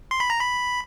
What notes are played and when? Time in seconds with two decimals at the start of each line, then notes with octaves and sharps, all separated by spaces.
0.11 C6
0.20 B5
0.30 A#5
0.40 B5